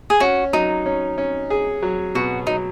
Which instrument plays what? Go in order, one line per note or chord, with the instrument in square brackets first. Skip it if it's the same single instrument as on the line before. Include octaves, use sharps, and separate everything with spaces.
[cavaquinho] G#4
[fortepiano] C#4 [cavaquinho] F#4
[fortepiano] F#3 [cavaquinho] D#4
[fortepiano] C#4
C#4
G#4
F#3
[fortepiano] B2 [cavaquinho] F#4
[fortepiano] F#3 [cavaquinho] D#4